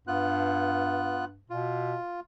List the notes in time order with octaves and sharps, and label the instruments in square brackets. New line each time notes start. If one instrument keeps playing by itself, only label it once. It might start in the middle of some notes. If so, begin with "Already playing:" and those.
[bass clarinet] G2 [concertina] B3 F4 F#6
[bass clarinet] B2 [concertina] F4